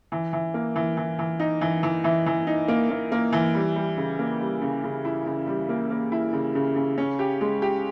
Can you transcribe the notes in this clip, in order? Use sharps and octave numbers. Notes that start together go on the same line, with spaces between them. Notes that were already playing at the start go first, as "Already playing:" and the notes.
E3
E3
A#3
E3
E3
E3
D#4
E3
E3
E3
E3
D#4
A#3
A#3
A#3
E3
G3
G3
C#3
A#3
G3
C#3
C#3
E4
C#3
G3
A#3
A#3
E4
C#3
C#3
C#3
C#4
G4
G#3
G4